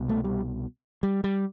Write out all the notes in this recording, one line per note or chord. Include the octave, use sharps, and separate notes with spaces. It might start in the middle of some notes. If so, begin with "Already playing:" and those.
Already playing: C2 B2
A3
G3
G3
G3